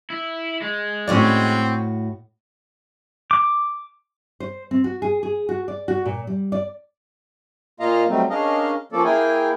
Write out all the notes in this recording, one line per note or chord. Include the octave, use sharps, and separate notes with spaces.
E4
G#3
A2 C4 C#4 F#4 C#5 D5
D6
C5
C4
F#4
G#4
G#4
F#4
D5
F#4
A#2
G3
D5
A#2 A#3 F4 D#5 F5 A#5
F#3 G3 A3 C4 D#4
C#4 D4 G#4 A#4 D#5 F5
F3 A#3 C#4 A4 D5
A#3 E4 G#4 A#4 G5 G#5